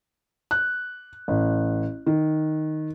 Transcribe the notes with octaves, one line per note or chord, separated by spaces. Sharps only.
F#6
A1
D#3